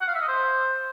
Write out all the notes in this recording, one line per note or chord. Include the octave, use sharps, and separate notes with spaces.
F#5
F5
E5
D#5
C5